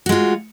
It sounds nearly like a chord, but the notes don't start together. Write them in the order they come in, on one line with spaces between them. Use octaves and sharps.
F#4 G#3 F4